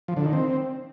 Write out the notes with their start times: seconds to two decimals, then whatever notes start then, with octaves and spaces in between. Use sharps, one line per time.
0.08 F3
0.17 D3
0.25 D#3
0.33 C4